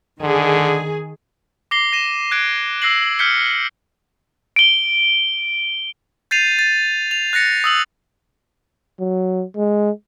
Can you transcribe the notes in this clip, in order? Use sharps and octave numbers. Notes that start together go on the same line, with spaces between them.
D3 D#3 G#4
D6 A#6 C7 G7
A#6 D#7 E7
F#6 G#6 D7
E6 F#6 A#6 C7 F#7
F6 G6 G#6 B6 C#7 G7
D7 G7
G6 A6 C7 D#7 F7
A6
F7
F#6 A6 A#6 C#7
D#6 E6 F#7
F#3
G#3